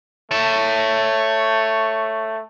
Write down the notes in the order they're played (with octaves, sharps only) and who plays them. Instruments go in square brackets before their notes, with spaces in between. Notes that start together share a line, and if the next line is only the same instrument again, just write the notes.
[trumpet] A3 [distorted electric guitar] C#5 A5